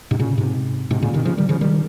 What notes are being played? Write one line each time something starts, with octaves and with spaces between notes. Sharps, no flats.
G#2 C3
A#2 C#3
G#2 C3
G#2 C3
A#2 C#3
C3 D#3
C#3 F3
D#3 G3
C#3 F3
D#3 G3